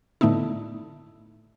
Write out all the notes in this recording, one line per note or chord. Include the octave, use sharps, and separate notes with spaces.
A2 D3 A3 B3 D#4 E4